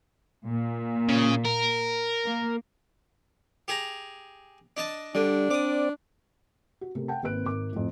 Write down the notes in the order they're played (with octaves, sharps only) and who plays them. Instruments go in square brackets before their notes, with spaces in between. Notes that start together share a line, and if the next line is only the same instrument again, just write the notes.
[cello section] A#2
[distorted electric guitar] C#3
A#4
[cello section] A#3
[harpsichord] G4 G#4 A#5
D4 D#5 A5
[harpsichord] D3 [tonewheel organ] G3 [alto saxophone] D4
[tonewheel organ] C4 D5 [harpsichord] D6 D#6
[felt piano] F#4
C3 A3 A#4
F#5 G5 A5
G#1 A#3 C4 B4 F#6 D7
G#1 A#4 D6
F2 A2